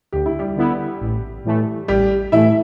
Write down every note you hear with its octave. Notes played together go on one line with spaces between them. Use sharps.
D2 G4
E4
G3 G4
D3 B3 E4
A1
A2 E3 A3
A1 G3 G4
A2 E3 A3 E4 E5